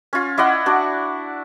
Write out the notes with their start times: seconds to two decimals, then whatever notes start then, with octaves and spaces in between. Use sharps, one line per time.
0.13 C#4 F4
0.38 E4 D5 D#5 F#5
0.66 D4 F#4